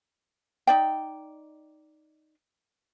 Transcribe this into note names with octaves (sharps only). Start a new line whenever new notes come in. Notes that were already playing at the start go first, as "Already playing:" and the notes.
D#4 D5 G5